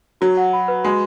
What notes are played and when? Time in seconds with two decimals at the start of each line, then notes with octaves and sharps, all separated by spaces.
0.21 F#3 F#4
0.37 F#5
0.53 B5
0.68 B4
0.84 G#3 F#4